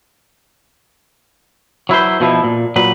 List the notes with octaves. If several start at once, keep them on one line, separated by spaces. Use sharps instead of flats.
F#3 E4 B4 C5
B2 F3 E4
A#2
A#2 F#3 B4